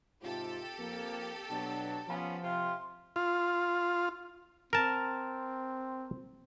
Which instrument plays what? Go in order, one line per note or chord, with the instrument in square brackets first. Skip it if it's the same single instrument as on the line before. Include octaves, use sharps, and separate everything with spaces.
[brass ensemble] G#2 C3 F4 [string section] G4 A4
[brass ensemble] F2 A#3
[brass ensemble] B2 F#3 D4 [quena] A5
[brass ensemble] F3 [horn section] B3 C#4 F4
[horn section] C3 F4 [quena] C6
[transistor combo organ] F4
[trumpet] C4 [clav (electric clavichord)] A#4 A5